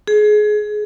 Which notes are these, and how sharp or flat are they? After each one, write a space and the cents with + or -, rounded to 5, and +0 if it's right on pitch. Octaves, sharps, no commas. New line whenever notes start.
G#4 +25